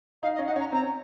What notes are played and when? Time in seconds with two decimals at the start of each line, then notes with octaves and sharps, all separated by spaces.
0.22 D#4 F5
0.35 D#5
0.38 C#4
0.47 D#4 F#5
0.56 C#4 A#5
0.72 C4 A#5
0.83 C#4